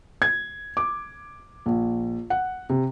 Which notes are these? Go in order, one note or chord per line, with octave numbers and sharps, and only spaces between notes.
G#6
D6
A#1
F#5
C3